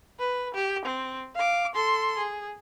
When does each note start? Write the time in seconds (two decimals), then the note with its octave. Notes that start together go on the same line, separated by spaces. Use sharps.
0.19 B4
0.54 G4
0.85 C4
1.35 F5 D6
1.75 A4 C6
2.18 G#4